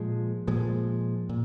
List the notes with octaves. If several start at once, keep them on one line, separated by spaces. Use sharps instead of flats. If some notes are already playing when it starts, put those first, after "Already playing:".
Already playing: A#2 F3 G#3
A#2 F3 G#3
A#2